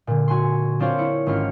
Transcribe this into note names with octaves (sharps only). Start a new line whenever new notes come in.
A#2 D3
F#4 G#5 C6
C4 D4 F4 C5 C#5 F5
E4 C#7
G#1 C#4 F4 F6 C#7